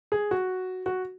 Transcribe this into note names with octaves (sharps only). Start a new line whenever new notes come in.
G#4
F#4
F#4